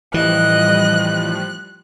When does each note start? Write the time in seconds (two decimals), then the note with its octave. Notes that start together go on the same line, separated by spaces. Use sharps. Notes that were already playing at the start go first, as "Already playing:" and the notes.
0.14 A2 E3 F3 G3 D#5 F#6